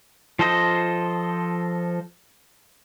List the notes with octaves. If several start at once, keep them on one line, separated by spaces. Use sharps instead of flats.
F3 F4 A4 C5 D#5